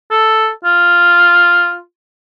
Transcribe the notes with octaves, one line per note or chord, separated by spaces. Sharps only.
A4
F4